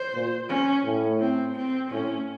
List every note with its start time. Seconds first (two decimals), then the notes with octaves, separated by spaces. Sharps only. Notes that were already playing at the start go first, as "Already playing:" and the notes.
Already playing: C5
0.14 A#2
0.49 C#4
0.84 A2
1.20 C4
1.56 C4
1.91 A2 C#4